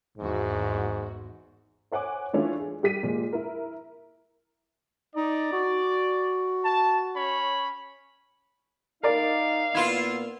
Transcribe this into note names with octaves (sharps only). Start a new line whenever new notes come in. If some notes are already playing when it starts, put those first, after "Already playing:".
G#1 E2 G#2 F#4
C5 C#5 F#5 G#5 D6
E3 A3 C#4 D4 F4
G#4
G3 G4 B6 D#7
A#2 F3 G#3
E4 A#4
D#4 D5
F#4
A5
C#4 C#5 B5
D#4 A#4 D5 F5
A#2 A#3 B3 E4 F4